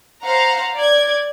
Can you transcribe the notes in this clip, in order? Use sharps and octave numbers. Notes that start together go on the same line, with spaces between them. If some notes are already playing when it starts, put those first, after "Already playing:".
C5 F5 F#5 A#5
D5 G#6